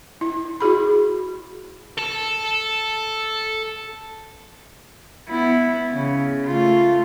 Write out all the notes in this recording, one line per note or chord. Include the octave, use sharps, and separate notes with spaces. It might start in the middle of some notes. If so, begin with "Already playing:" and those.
E4
E4 F#4 G#4 B5
A4 A5
B3 E4
C#3
A3 F4